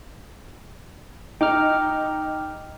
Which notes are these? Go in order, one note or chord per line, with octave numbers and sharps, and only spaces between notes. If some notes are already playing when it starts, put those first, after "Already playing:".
D#4 G5 D6 F6